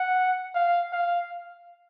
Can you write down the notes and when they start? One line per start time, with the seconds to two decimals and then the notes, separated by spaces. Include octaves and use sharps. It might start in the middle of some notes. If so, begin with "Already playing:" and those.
Already playing: F#5
0.55 F5
0.93 F5